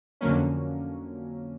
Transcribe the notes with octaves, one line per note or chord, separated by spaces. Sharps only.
F2 D3 F#3 A#3 C#4